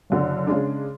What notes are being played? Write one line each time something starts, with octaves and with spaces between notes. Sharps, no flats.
F#1 F#2 D3
C#3 G#3 D4